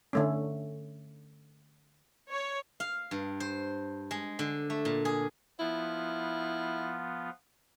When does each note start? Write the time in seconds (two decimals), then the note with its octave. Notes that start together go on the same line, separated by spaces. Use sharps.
0.13 D3 A3 C#4
2.31 C#5
2.80 F5
3.11 G2
3.40 C5
4.11 G#3
4.39 D3
4.70 A3
4.85 A#2
5.05 G#4
5.59 F3 B3 E4 F4